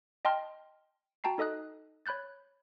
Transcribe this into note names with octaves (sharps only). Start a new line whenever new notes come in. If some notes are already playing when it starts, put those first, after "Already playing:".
D#5 G5 A5 C6 F6
F#4 G5 A5 A#5 C7
D#4 A4 D#5 D#6 F#6
C#5 B5 F#6 G6 A6